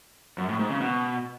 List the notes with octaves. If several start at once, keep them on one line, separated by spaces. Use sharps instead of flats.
F#2
A2
G#2
C#3
B2